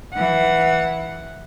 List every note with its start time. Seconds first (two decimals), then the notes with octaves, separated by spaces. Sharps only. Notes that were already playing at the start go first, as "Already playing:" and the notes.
0.14 E3 F#5